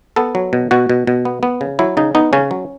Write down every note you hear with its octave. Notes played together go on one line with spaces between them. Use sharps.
B3 A4
F#3
B2
B2 F#4
B2
B2
B3
B3
C#3
F#3 E4
C#3 D#4
B3 D#4
C#3 C#4
F#3